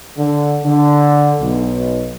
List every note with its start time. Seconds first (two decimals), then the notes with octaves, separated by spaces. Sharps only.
0.17 D3
0.65 D3
1.41 B1